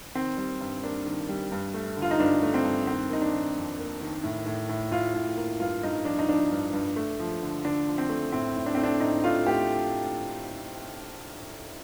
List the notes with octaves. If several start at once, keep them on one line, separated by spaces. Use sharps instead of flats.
D#3 C4
G3
G2
A#3 D4
D#3
G3
G2
A3
D3
F4
D#4
G2 D4
A3
C4
G2
D#3 C4
A#3 D#4
D4
D#3
F2
A#3
D#3
A2
A2
A2
A2 F4
A2
A#3
G2 F4
G2 D#4
F3 D4
D#4
F3 D4
G2
G2
A3
F3
D3
D3 D4
F3
C4
A3
A2 C4
A2
D4
A3 C4
D4
A2 D#4
A3 F4
A3 G4